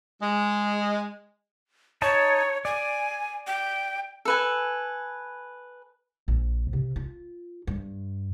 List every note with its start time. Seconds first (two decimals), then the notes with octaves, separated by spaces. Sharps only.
0.22 G#3
2.02 D#4 C#5 A5
2.65 D5 G#5
3.47 G5
4.25 A4 B4 G#5
6.28 A#1
6.73 C3
6.96 F4
7.67 G2